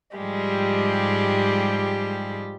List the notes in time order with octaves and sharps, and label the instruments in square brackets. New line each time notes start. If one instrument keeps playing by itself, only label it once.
[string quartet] G#2 F3 G3 G#3 G4